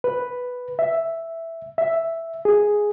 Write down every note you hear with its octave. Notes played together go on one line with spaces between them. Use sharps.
B4
E5
E5
G#4